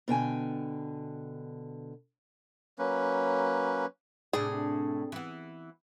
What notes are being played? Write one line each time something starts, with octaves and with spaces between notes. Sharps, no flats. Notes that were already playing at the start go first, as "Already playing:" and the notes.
B2 D3 G5 G#5
F#3 A#3 C#4 B4
A2 C3 D4 G#4
E3 B3